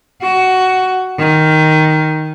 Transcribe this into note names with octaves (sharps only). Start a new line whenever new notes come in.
F#4
D#3